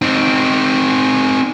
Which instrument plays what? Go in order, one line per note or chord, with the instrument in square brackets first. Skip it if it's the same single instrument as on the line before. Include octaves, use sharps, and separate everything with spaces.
[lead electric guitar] C4 D#4